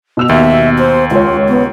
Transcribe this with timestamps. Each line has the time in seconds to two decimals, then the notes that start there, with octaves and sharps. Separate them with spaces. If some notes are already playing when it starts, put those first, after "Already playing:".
0.17 B2 E6 F7
0.29 D#2 E5
0.79 C5
1.11 C#2 F4 C#5
1.49 B3